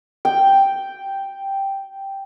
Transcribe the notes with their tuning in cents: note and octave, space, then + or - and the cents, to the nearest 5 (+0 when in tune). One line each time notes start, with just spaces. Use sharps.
G5 +0